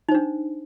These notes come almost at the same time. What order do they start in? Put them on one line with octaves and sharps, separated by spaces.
D#4 C5 D4